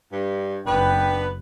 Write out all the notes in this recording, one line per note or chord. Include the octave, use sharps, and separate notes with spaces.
G2
F#1 B3 D4 B4 G5